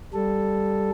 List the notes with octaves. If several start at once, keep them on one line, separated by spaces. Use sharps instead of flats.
G3 A4